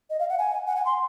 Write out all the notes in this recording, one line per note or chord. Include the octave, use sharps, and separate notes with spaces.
D#5
F5
F#5
G#5
F#5
G#5
C6